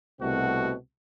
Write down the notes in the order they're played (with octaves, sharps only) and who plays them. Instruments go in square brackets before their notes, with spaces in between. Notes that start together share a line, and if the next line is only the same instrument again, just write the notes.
[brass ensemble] C2 B2 A3 C4 F#4